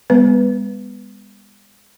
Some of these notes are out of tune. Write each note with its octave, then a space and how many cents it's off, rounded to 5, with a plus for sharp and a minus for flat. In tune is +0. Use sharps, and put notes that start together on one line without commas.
G#3 -45 B3 +0 B4 +0